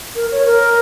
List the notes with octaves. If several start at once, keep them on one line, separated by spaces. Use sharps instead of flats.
A#4
C#5
A#4